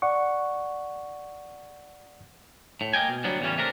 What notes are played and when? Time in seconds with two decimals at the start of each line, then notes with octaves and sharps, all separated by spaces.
0.02 D5 F#5 C#6
2.81 A2
2.93 A#3 D#5 G5 G#5
3.09 B2
3.24 D2 D3 F#3 G3 B3
3.41 E2 A2 C#3 E3 G3 C#4
3.58 C3 A3 D4 A#4